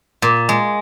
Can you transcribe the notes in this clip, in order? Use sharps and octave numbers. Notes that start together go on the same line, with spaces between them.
A#2
G#3